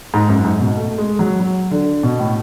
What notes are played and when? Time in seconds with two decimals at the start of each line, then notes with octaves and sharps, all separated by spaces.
0.14 G#2
0.29 F#2
0.45 G#2
0.61 B2
0.77 A3
0.98 G#3
1.19 F#3
1.40 F#3
1.71 D3
2.03 B2
2.19 A2